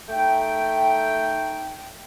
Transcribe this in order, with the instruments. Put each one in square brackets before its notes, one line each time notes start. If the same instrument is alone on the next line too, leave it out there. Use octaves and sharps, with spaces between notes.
[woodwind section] A3 D#4 G5